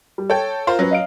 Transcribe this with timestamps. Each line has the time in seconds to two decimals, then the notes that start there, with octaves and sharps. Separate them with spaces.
0.18 G3
0.30 A4 C#5 G5
0.67 F4 A#4 C5
0.79 F#3 C#4 B4
0.91 D#5 F5 D7